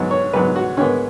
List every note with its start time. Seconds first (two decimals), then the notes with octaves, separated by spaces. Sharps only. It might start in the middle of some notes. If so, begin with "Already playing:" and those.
Already playing: G#2 F#3 B3
0.11 C#5
0.33 G#2 F#3 B3 B4
0.56 F#4
0.77 G#2 D#3 B3 C#4